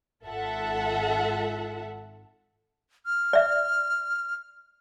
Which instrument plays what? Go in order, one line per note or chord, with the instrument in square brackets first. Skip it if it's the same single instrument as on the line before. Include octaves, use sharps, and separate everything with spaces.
[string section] G#1 F4 A4 E5 F#5
[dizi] F6
[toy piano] D5 E5